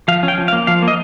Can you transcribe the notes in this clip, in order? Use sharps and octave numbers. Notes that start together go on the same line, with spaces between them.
F3 F5
C#4
G5
F3
F5
A#3
F3 F5
A#3
D#5